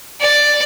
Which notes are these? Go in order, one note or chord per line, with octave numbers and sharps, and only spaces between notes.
D5